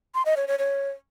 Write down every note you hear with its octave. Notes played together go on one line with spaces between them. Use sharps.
C6
D#5
C#5
C#5
C#5